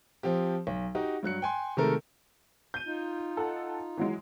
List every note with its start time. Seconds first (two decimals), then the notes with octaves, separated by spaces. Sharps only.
0.23 F3 C4 G4
0.67 B1
0.95 D#4 F#4 G4
1.23 G2 F#3 F#6 C#7
1.42 G5 G#5 C6
1.77 C3 D#3 G#3 A3 A4 A#4
2.74 G6 D#7
2.86 D#4 F4
3.37 A4 F#5
3.97 E3 F#3 G#3